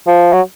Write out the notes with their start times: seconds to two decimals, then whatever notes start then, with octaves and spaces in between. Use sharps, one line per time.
0.07 F3
0.33 F#3